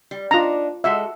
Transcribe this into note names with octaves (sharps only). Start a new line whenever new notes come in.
G3
D4 D#4 F4 A#5
G#3 F#4 A4 E5